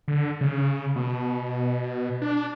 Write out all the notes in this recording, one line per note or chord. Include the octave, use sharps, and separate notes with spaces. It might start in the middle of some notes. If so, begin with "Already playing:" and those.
D3
C#3
B2
D4